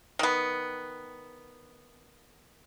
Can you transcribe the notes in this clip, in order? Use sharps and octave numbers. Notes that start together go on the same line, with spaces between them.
D#3 B3